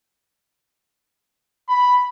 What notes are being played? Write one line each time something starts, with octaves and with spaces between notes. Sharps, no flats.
B5